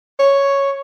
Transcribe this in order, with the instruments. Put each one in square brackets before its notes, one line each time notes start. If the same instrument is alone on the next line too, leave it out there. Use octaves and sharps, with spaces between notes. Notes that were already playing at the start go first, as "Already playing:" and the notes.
[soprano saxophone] C#5